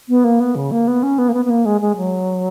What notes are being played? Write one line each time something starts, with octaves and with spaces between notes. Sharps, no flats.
B3
A#3
B3
C#3
A#3
B3
C#4
B3
A#3
B3
B3
A#3
G#3
G#3
F#3